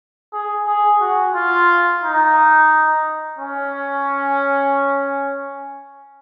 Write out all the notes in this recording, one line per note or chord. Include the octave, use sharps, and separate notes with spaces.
G#4
G#4
F#4
F4
D#4
C#4